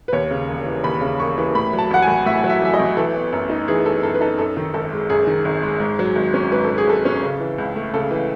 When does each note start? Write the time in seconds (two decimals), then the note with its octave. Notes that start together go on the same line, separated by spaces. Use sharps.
0.08 B4
0.13 D#2 C#5
0.31 C#3
0.48 E1
0.66 E3
0.84 D#2 B5
1.01 C#3
1.19 E1 C#6
1.38 E3
1.55 A2 B5
1.73 F#3
1.79 A5
1.91 A1 F#5
2.02 G#5
2.08 A1
2.26 A2 E5
2.44 F#3
2.50 E5
2.61 A1 E5
2.74 D#5
2.79 A1
2.97 E3 A4
3.15 B3
3.32 F#2
3.50 D#4
3.68 E3 G#4
3.86 B3 A4
4.03 F#2 A4
4.15 B4
4.21 D#4 A4
4.38 F#2 A4
4.57 D#3
4.74 G#1 A4
4.93 G#3
5.10 F#2 G#4
5.27 D#3
5.45 G#1
5.63 G#3
5.80 G#2
5.99 F#3
6.16 G#1
6.34 C#4
6.52 G#2 B4
6.64 F#3 A4
6.78 G#4
6.87 G#1 A4
7.05 C#4
7.23 C#3
7.40 E3
7.58 C#2
7.76 A3
7.94 C#3 A4
8.11 E3